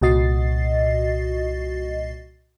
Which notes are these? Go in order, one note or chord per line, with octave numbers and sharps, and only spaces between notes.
C2 A#2 F#4 D#5 A6 C7